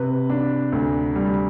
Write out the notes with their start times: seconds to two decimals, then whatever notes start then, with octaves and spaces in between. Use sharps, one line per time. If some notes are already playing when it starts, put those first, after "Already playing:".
Already playing: C3 B4
0.29 D4
0.72 D2
1.16 G3